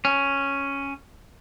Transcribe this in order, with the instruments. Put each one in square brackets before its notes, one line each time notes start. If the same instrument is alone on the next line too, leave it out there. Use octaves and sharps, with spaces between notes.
[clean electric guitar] C#4